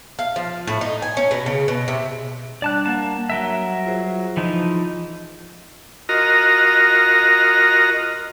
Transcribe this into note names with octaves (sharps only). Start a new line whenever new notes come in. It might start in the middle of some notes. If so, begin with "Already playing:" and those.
F5
F3
A2
D#4
G#5
C#4
B2
C#3
B2
C3
G3 D4 D5 A5 F#6
G3 A#3 F#5 A5
F#3 A#4 E5
F4 G#4 C5
E3 F3 D#4
F4 F#4 A#4 D#5 A#5